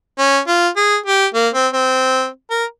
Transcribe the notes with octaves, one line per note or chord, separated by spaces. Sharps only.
C#4
F4
G#4
G4
A#3
C4
C4
A#4